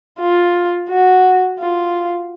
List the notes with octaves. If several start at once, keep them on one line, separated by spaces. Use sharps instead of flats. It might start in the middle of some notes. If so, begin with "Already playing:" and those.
F4
F#4
F4